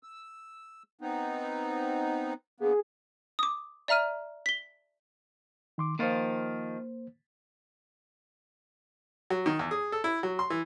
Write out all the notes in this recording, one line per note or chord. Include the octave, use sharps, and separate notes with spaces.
E6
B3 C4 D#4
D3 A#3 B3 G#4
D6 D#6
D5 E5 A#5 F6 D#7
B6 G7
D#3 C6 D6
D#3 F3 A#3 F4 C5
F#3
D#3
E2
G#4
A4
E4
F#3
C6
E3